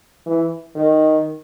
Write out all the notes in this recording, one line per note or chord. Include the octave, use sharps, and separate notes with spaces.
E3
D#3